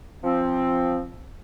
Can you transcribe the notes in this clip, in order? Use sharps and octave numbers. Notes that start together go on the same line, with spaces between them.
F3 C4